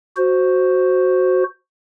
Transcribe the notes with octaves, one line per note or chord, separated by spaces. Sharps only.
F#4 C5